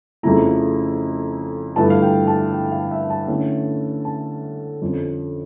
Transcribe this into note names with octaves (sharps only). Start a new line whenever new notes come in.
F2 C#3 F3 A3 E4 A#5
G2 D3 F3 A3 E4 A5
F5
G5
A5
G5
F5
E5
A5
D3 A3 C#4 E4
A5
F2 D3 F3 C#4